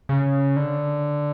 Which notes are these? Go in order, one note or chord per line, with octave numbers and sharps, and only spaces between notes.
C#3
D3